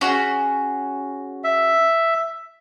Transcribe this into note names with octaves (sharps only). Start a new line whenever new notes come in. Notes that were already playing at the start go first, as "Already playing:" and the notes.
C#4 F#4 G#4
E5